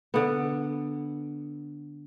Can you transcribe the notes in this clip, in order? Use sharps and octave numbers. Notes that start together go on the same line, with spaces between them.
D3 B3